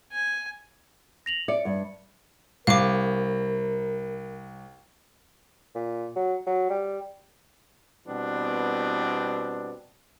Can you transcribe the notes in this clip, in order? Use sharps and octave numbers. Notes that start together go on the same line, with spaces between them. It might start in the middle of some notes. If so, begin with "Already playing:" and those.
G#5
A#6 F7 F#7
D5 E5 C#7
G2
C2 A#4 F5 D6
A#2
F#3
F#3
G3
B2 E3 G3 B3 C4 D4